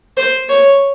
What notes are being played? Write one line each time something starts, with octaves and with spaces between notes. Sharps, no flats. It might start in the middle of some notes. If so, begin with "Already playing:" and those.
C5
C#5